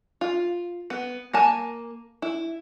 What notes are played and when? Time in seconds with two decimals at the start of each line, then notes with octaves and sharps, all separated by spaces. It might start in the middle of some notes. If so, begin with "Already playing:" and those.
0.21 F4
0.90 B3
1.33 A#3 G#5 A5
2.22 E4